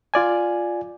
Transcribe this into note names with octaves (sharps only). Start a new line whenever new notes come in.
F4 D5 G#5